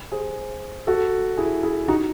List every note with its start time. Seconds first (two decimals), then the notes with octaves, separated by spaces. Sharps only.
0.12 G#4 C5
0.87 F#4 A4
1.37 E4 G#4
1.63 E4 G#4
1.88 D#4 F#4